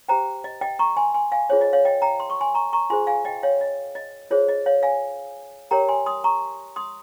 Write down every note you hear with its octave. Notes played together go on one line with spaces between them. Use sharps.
G4 C5 G5 A#5
D#5
D#5 G5
A#5 C#6
G#5 C6
G#5 C6
F5 G#5
F4 G#4 C5 C#5
D#5
C#5 F5
D#5 G5
G5 A#5
C6
C#6
G#5 C6
A#5 C#6
A#5 C#6
F4 G#4 C5 G#5 C6
F5 G#5
D#5 G5
C#5 F5
D#5
D#5
F4 G#4 C5 C#5
D#5
C#5 F5
F5 G#5
G4 A#4 C#5 G5 A#5
G#5 C6
C6 D#6
A#5 C#6
C6 D#6